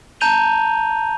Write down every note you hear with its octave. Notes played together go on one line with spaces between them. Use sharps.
A5 A#5 G6 D#7 F7 G7